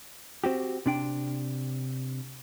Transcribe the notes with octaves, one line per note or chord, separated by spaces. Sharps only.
C4 F#4 G4
C3 D4 G5